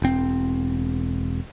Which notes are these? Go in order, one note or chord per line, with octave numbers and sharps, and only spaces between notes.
E1 C4